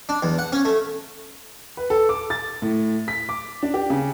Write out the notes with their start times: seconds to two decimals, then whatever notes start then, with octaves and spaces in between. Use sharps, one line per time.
0.09 D4
0.23 E2
0.39 F#5
0.52 C#4
0.65 A3
1.77 B4
1.90 A4
2.09 D6
2.30 A6
2.62 A2
3.08 B6
3.29 D6
3.63 D4
3.74 G4
3.90 C#3